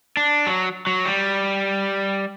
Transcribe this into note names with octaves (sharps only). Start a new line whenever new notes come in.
D4
F#3
F#3
G3